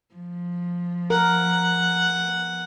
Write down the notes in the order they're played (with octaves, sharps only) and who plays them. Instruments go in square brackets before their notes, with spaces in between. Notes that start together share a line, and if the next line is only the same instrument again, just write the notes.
[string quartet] F3
[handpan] A#4 [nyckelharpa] F#5